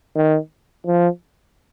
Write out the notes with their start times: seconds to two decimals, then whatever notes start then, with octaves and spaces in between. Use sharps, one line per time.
0.16 D#3
0.87 F3